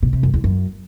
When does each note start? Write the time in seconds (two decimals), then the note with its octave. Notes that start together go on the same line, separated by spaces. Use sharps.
0.03 B2
0.13 C3
0.23 F#2
0.34 E2
0.44 F#2